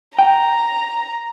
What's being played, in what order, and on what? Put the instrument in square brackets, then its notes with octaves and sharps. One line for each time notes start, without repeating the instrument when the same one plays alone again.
[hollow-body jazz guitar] G5 [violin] A#5